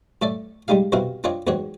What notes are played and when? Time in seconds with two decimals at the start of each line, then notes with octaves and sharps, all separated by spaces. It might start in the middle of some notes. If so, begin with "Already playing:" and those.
0.22 A2 A3 A4 D5
0.68 G3 G#3 D#4 G4 F5
0.92 C2 B2 C4 E4 F#4 F5
1.24 C4 D4 F4 A#4 C#5 D#5
1.47 E2 G#2 C4 F#4 C#5